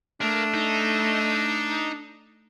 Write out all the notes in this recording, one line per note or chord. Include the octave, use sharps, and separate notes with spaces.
A3 A#3 D4
D#4